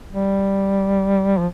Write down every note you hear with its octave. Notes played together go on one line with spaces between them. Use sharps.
G3
F3